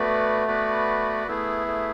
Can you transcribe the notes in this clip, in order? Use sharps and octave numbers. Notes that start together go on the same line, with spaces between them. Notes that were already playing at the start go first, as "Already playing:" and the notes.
Already playing: A3 B3 F#4 B4 D5
B3 F#4 B4 D5
A3 B3 E4 G#4
A3